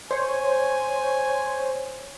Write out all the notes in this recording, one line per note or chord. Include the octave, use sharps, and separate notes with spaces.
C5 C#5 G#5